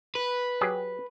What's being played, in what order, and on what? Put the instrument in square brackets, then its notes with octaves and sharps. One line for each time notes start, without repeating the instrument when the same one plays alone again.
[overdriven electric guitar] B4
[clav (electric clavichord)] F#3 G4 G#4